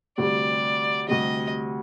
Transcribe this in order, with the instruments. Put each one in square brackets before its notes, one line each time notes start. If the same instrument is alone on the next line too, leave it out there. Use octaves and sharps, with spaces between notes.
[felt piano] D2 C3 G3 [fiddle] D5
[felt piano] D2 C3 G3 [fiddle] D#5